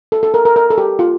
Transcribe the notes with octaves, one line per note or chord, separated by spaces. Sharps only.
A4
A4
A#4
A#4
A#4
A4
G4
F4